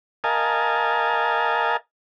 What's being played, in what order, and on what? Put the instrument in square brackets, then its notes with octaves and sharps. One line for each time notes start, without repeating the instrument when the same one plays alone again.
[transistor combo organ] A#4 D#5 F5 G#5 A5